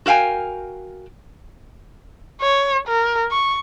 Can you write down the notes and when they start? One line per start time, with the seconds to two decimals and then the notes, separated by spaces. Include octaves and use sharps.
0.06 F#4 A#4 F5 G5 G#5
2.42 C#5
2.88 A#4
3.31 C#6